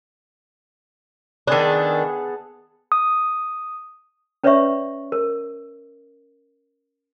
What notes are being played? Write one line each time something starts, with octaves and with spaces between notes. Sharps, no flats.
D#3 B3 D4 G#4 A4
D#6
C#4 B4 C#5 D5 E5 C#6
A#4